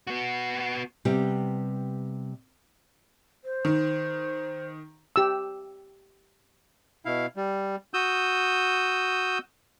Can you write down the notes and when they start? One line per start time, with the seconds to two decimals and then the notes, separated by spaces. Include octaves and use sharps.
0.07 B3 F#4
1.05 C3 G3 B3 G4
3.44 C5
3.65 D#3
5.16 G4 E6
7.05 B2 E4 F5
7.36 G3
7.94 F#4 D#6 E6 G6